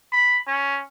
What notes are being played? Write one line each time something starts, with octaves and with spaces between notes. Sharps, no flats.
B5
C#4